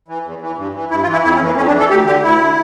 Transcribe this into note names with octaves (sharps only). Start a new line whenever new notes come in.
E3
E2
E3
G2
E3
G2 E4
F4
E3
E4
F2 E4
C#4
E3
A#3
F2 C#4
D4
E3
A4
D2 G4
D3 G4
D2 E4
D3